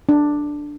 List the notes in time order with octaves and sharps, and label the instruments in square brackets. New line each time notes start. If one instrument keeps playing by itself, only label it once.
[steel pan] D4